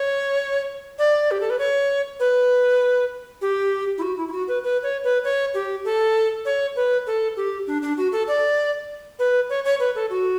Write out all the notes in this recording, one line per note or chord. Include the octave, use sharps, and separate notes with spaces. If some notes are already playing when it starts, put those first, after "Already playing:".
Already playing: C#5
D5
G4
A4
B4
C#5
B4
G4
E4
F#4
E4
E4
F#4
B4
B4
C#5
B4
C#5
G4
A4
C#5
B4
A4
G4
D4
D4
F#4
A4
D5
B4
C#5
C#5
B4
A4
F#4